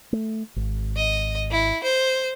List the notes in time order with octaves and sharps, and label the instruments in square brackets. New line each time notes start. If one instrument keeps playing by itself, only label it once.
[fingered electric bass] A3
G#1
[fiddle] D#5
E4
C5